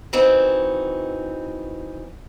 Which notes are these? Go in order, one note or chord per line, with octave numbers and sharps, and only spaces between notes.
E3 C4 D#4 F#4